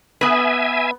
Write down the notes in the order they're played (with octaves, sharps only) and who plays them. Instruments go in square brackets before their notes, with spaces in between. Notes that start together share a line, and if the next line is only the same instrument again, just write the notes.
[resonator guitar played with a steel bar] B3 B4 [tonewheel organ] E5 G#5